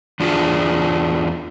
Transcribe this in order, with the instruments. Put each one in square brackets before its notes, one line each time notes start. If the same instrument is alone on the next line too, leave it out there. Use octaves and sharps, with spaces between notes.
[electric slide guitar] E2 D4 F4 G#4 A5